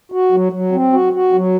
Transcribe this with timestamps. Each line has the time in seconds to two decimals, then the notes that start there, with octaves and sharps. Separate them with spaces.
0.12 F#4
0.32 F#3
0.52 F#3
0.72 C4
0.93 F#4
1.13 F#4
1.33 F#3